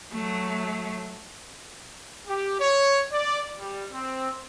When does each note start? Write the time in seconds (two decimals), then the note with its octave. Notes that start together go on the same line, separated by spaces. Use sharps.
0.13 F#3 A3
2.28 G4
2.60 C#5
3.11 D5
3.59 G3
3.92 C4